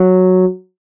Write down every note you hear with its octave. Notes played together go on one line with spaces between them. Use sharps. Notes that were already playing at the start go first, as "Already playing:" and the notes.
Already playing: F#3